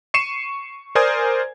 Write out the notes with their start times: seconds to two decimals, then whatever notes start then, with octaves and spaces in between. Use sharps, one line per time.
0.14 C#6 C7 C#7 D#7 E7
0.95 A#4 C5 D5 G#5 D#6 G#6